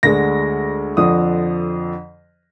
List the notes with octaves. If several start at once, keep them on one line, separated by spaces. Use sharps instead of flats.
D2 D3 G#3 A#6
F2 D3 F3 D#6